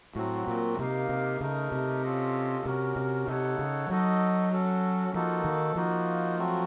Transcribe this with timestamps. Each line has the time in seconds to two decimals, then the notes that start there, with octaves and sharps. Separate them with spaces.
0.16 A2 F#3 C4 F#4
0.48 A#2
0.78 C3 A#3 D#4 A#4 F5
1.09 C3
1.40 C#3 A3 D#4 A#4
1.72 C3
2.03 C#4 F4 A4 D#5
2.66 C3 C#4 F#4 A#4
2.96 C3
3.27 C3 D#4 A4 C#5 F#5
3.59 C#3
3.90 F#3 D#4 F#4 A4 D#5
4.52 C#4 F#4 A4
5.14 F3 A#3 D#4 F#4 A4
5.45 D#3
5.76 F3 A#3 D#4 F#4
6.38 F#3 A3 C4 F#4